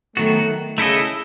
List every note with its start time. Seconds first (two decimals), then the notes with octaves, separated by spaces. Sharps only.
0.17 D#3 F#3 A3 B3 F#4
0.48 D#3
0.78 C#3 A3 E4 A4 D#5